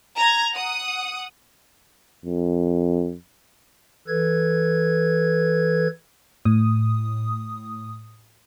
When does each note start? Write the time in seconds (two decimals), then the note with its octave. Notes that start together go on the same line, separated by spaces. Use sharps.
0.17 A#5 G#6
0.53 F#5 D#6
2.25 F2
4.08 E3 A4 B4 G#6
6.45 A2 D#6